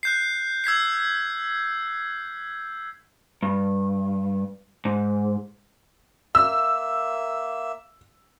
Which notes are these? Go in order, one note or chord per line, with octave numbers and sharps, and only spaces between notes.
F#6 G6 C7
E6 G#6 B6 C7
G2
G#2
A#3 E5 E6